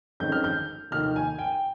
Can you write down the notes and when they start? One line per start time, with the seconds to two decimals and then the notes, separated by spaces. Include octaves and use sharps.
0.20 G1 F2 D#3 G#3 C#4 G6
0.32 F6
0.44 G6
0.91 F1 D#2 D#3 F6
1.16 G#5
1.39 G5